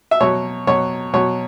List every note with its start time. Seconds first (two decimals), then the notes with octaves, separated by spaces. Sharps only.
0.11 E5
0.20 B2 F#3 C#5
0.67 B2 F#3 C#5
1.13 B2 F#3 C#5